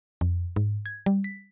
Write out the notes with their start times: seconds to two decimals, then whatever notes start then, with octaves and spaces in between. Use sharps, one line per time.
0.21 F2
0.56 G#2
0.86 G#6
1.06 G3
1.24 B6